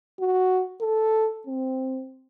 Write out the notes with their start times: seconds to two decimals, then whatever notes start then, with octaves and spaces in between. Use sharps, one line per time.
0.20 F#4
0.81 A4
1.47 C4